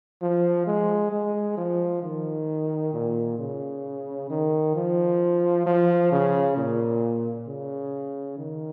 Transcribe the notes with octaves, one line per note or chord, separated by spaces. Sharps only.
F3
G#3
G#3
F3
D#3
A#2
C#3
D#3
F3
F3
C#3
A#2
C#3
D#3